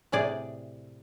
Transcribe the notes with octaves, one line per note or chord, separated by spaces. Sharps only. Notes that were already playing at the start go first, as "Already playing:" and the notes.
A2 C3 G#4 D5